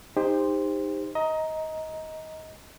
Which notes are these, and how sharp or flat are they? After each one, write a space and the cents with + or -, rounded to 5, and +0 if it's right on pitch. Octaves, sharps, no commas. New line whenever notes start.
D#4 +0 G4 +35 C5 +0
D#5 +20 A#5 +0